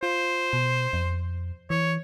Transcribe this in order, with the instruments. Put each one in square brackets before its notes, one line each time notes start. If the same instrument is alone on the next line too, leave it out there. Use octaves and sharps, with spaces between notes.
[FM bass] F4 [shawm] C5
[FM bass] B2
F2
[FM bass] E3 [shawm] C#5